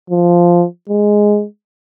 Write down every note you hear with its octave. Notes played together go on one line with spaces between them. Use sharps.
F3
G#3